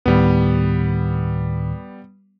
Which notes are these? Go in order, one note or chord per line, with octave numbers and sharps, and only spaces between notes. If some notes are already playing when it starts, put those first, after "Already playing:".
D2 A2 D#3 G3 B3